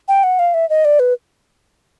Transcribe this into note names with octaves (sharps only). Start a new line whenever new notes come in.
G5
F#5
F5
E5
D#5
D5
B4